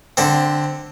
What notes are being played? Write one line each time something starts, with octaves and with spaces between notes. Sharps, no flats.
D3 C4